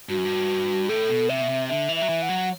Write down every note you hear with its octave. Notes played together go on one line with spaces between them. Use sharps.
G2 F#4
F#2
G2
A2 A4
B2
C3 E5
B2
C3
D3 E5
E3
E5
F#3
E3
F#5
F#3